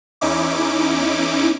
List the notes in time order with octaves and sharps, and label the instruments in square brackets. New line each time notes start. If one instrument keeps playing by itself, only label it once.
[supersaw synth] E2 C#4 D#4 E4 D6